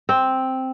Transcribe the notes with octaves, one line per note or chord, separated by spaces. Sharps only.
C4